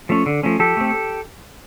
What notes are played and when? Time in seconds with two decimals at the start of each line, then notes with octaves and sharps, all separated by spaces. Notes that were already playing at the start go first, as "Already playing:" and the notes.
0.09 F3 A3 C#4
0.26 D3
0.43 F3 A3 C#4
0.59 F3 G4 A4
0.77 A3 C4